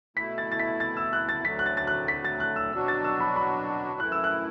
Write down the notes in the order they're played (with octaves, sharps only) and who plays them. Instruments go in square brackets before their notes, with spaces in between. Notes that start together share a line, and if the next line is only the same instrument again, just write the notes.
[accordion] B2 A3 E4 [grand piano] B6
[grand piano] A6
A6
B6
A6
E6
F#6
A6
[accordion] D2 D3 F#3 A3 [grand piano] B6
[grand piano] F#6
A6
A6
F#6
B6
A6
F#6
E6
[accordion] B2 F#3 D4 F#4 [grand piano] E6
[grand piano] A6
E6
B5
B5
[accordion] F#2 E3 A3 E4 [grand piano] F#6
[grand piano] E6
F#6